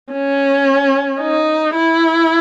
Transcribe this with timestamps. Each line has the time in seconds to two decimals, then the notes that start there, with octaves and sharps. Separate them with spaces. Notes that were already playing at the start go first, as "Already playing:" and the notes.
0.13 C#4
1.21 D#4
1.74 E4